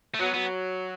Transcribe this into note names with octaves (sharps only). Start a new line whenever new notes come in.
A3
F#3 B3
F#3 B3